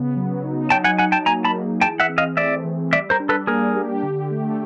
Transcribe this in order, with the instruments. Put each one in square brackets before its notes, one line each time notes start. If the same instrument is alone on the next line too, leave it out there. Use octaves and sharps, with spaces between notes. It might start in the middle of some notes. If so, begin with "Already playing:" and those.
Already playing: [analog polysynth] C#3 B3
F#3
D#4
[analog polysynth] F#3 [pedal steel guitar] G5 A5
[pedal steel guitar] F#5 G#5
[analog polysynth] D#4 [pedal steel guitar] F#5 G#5
[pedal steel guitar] G5 A5
[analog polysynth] A#3 [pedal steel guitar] G#5 A#5
[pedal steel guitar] A5 B5
[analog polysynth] G#4
[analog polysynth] E3 [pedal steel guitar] G5 A5
[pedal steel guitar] E5 F#5
[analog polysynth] C4
[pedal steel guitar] D#5 F5
[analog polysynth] A3 [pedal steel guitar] D5 E5
[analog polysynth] E3
[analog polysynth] G3 [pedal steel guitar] D5 E5
[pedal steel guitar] A#4 C5
[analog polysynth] D4
[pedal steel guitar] A4 B4
[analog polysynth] A#3 [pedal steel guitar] G#4 A#4
[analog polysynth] G4
D3
A3